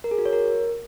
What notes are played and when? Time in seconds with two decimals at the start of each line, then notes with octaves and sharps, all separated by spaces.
0.04 A#4
0.11 G#4
0.18 F#4
0.26 C#5
0.33 A#4